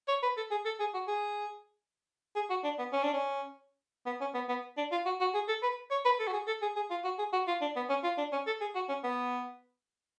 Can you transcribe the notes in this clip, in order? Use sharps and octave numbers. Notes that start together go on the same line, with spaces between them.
C#5
B4
A4
G#4
A4
G#4
F#4
G#4
G#4
F#4
D4
B3
C#4
D4
C#4
B3
C#4
B3
B3
D4
F4
F#4
F#4
G#4
A4
B4
C#5
B4
A4
F#4
G#4
A4
G#4
G#4
F4
F#4
G#4
F#4
F4
D4
B3
C#4
F4
D4
C#4
A4
G#4
F#4
C#4
B3